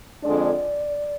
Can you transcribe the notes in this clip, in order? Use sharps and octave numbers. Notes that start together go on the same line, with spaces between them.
F2 D3 G#3 D4 D5